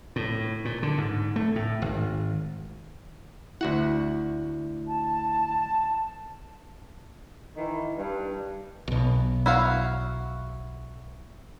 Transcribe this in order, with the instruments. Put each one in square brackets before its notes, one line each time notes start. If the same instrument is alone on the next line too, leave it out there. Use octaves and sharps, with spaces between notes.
[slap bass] A2
A#2
D3
G#2
A3
A2
G#1
[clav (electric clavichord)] D2 F#4 F#5 [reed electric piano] E4
[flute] A5
[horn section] D#3 E3
G2
[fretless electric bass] B1 B2
[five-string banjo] E4 F#4 F5